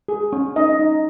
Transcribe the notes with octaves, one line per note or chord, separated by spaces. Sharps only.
G#4
C#4
D#4 D#5
D#4